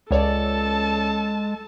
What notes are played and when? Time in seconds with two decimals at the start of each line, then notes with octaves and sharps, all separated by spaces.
0.11 C#2 G#3 A4 C#5 D5 A5